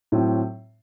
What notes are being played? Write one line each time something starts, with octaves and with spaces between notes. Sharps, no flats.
A2 F#3 C4